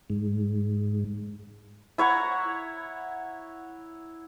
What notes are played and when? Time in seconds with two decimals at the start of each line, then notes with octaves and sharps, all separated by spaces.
0.10 G#2
1.98 E4 C#5 F#5 A#5